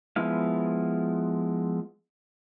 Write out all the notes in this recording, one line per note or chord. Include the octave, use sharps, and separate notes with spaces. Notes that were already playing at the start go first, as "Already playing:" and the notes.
F3 G#3 B3 E4 F5